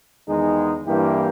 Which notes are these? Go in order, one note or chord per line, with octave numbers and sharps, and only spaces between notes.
E2 D#3 G#3 D#4 G#4
G2 E3 A#3 E4 G4